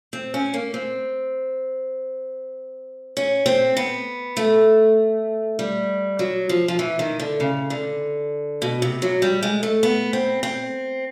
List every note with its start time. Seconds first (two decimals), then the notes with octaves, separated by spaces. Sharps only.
0.13 C4
0.34 C#4
0.54 A#3
0.74 C4
3.17 C#4
3.46 C4
3.77 B3
4.37 A3
5.59 G3
6.19 F#3
6.49 F3
6.68 F3
6.79 E3
6.99 D#3
7.20 D3
7.40 C#3
7.70 D3
8.62 B2
8.82 C3
9.02 F#3
9.22 G3
9.43 G#3
9.63 A3
9.83 B3
10.13 C4
10.43 C4